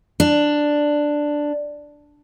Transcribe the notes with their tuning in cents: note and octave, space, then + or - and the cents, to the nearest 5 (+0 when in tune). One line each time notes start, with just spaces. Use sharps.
D4 +5